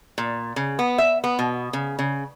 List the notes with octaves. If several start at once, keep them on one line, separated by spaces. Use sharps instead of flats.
A#2
C#3
B3
E5
B3
B2
C#3
C#3